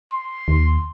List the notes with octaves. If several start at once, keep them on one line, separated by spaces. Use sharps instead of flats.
C6
D#2